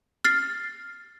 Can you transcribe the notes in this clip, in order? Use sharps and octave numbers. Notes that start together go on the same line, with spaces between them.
F6 A6 C7